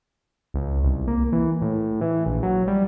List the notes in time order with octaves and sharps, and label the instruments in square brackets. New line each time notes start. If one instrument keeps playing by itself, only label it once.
[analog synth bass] C#2
C2
A#3
E3
A2
E3
A#1
F#3
G3